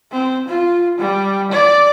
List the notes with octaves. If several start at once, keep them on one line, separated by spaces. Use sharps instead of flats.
C4
F4
G3
D5